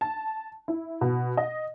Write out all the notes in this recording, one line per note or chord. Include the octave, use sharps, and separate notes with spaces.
A5
E4
B2
D#5